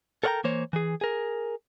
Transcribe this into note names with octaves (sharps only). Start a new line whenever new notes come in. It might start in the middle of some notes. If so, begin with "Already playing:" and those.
A4 A#4 C#5 F#5 G5 A#5
E3 A#3 C5 C#5
E3 G#4
G#4 A#4